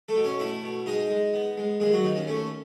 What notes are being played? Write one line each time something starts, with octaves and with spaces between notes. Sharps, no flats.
A3 A4
B2
C#4 C#5
A3 E4 E5
B2
G#3 D#4 D#5
G#3
B3
G#3
D#2 G#3 G#4
F#3 F#4
D#2 D#4
C#4
A3 C#4